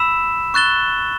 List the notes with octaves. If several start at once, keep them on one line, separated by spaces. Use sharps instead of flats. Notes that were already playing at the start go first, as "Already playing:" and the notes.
Already playing: B5 E6 B6 E7
C#6 F#6 A6 E7 G7